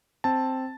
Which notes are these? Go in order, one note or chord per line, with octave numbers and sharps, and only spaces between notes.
C4 A5